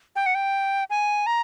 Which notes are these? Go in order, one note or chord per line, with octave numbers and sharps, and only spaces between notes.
G5
F#5
G5
G#5
A#5